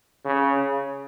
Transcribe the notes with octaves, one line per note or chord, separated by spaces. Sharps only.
C#3